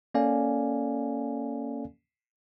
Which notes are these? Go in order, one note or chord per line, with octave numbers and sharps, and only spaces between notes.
A#3 C#4 A4 D5 F5 G#5